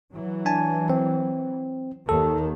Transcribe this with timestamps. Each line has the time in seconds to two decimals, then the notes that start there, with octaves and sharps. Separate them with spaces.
0.13 E3 F#3
0.45 D4 G#5 A5
0.90 C4
2.09 D#2 D#3 A4